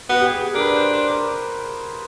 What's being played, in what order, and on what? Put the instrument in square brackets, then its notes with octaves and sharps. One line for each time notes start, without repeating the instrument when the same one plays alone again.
[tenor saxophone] B3 [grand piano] F#4
[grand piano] G4
G#4
[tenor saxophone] D4 [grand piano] A#4
[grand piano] B4
C5
C5
A#4